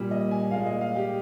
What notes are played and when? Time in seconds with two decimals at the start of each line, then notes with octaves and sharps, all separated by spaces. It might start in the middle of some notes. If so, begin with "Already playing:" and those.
Already playing: A#2 G3
0.11 D#5
0.31 G#5
0.51 A#2 F5
0.54 G#3
0.66 D#5
0.81 F5
0.96 G4